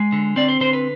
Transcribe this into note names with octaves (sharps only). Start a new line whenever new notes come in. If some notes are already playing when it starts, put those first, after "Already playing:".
Already playing: G#3
D3
C4 D5
C5
D3 C5
B4